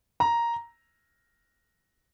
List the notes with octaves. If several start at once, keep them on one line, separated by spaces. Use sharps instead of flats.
A#5